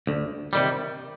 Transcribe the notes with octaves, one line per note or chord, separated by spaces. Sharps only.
D2
C3 D#3 G3